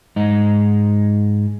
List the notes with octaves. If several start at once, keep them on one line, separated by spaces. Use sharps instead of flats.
G#2 G#3 D#4